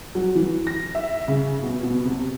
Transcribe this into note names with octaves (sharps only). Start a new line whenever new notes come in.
F#3
E3
A#6
E5
C#3
B2
B2
C3